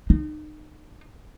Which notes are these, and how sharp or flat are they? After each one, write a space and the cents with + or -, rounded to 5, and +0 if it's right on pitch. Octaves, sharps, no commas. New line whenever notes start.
D#4 -35